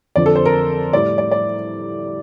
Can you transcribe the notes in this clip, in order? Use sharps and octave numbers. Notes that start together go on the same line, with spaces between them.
F2 D3 F3 D5
A4
C5
A#4
A2 G3 D5
D5
D5